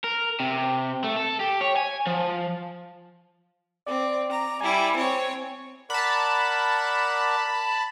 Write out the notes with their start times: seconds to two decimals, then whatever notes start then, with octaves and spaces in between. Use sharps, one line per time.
0.04 A#4
0.40 C3
1.04 A3
1.17 A4
1.40 G4
1.61 C#5
1.77 G#5
2.07 F3
3.86 C4 D5
4.31 A#5
4.61 G3 E4 G#5
4.96 C4 C#5
5.90 A#4 D5 F#5 A5 B5